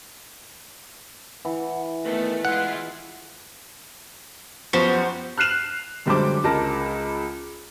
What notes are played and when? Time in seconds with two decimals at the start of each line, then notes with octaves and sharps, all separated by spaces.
1.45 E3 F#5
2.05 D#3 A3 B3 B4
2.45 G#3 E4 F4 F#5
4.73 F#2 F3 B3 F#4 G4 C5
5.38 F6 F#6 C7 E7 F7
6.06 F#2 D3 G3 G#3 C5 D6
6.44 C#2 G#3 A#4 A5 A#6